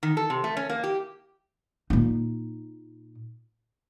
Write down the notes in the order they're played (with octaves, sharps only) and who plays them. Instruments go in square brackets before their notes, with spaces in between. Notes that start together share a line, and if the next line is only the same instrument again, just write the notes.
[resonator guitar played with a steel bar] D#3
A4
C3
A3
C#4
A#3
G4
[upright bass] A#2 D#4